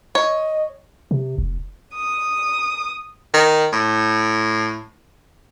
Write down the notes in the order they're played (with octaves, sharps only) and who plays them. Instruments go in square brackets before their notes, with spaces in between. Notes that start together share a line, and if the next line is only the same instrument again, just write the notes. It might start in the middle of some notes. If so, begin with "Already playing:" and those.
[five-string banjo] C#5 [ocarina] D#5
[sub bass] C3
F1
[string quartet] D#6
[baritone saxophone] D#3
A2